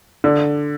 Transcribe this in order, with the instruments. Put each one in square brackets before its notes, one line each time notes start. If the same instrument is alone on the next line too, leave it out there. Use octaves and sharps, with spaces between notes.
[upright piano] D3